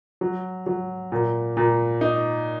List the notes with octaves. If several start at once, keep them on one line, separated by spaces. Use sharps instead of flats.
F#3
F#3
A#2
A#2
D#4